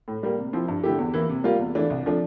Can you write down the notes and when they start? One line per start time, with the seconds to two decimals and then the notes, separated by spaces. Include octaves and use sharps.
0.08 A2
0.23 G3 A#3
0.38 C3
0.53 F3 C4 E4
0.68 G2
0.83 D3 A3 E4 G4
0.98 E2
1.14 E3 A#3 E4
1.29 C3
1.44 G3 A#3 F4
1.59 E2
1.75 E3 A3 D4
1.90 C2
2.05 C3 F3 A3 D4